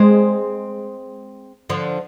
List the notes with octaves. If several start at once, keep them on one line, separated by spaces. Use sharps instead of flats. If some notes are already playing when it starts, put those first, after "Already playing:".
Already playing: G#3 C4
D3 F3